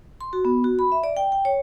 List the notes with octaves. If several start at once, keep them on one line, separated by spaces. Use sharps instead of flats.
C6
F#4
B3
F#4
B5
E5
D5
G5
G5
C#5